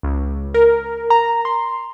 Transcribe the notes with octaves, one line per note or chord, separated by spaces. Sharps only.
C#2
A#4
A#5
C6